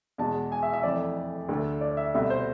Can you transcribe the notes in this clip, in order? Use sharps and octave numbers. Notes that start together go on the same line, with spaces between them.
E2 B2 G#3 A5
G#5
E5
E5
F2 E3 A3 D5
D2 D3 A3
D5
E5
C2 B2 A3 E5
C5